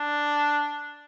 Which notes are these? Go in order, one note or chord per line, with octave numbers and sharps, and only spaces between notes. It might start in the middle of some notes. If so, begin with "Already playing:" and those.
Already playing: D4